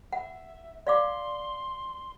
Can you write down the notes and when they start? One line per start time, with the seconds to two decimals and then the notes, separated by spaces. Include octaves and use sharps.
0.13 E5 F#5
0.87 D5 F5 C6 D6